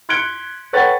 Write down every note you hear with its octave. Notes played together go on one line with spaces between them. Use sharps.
C6 F#6 G#6 C#7 D7 G7
A4 B4 C#5 F#5 G5 A6